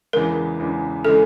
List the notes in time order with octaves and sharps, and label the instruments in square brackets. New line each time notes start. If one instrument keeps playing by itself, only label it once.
[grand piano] E2 C#3 E3 G#3 [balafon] A#4
[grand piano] E2 C#3 E3 G#3
[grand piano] C#3 E3 G#3 [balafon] A4